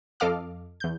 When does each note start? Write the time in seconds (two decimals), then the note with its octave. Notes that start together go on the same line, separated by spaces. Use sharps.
0.20 F2 A4 D#5 F5 D6 F6
0.80 E2 G6